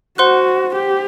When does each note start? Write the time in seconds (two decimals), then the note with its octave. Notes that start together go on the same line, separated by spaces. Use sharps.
0.18 F#4 C5 F#5 C6 F#6
0.76 G4